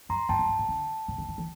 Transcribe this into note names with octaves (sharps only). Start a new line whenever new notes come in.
F#2 A#5 C6
F#2 G5 A5
F#2
G2
A2
D3
C#3
D3
D#3
E3